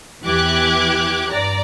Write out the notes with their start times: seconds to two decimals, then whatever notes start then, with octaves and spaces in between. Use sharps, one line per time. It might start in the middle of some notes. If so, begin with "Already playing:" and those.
0.24 E2 E3 G4 D6 F#6 G#6
1.31 G2 D5 A#5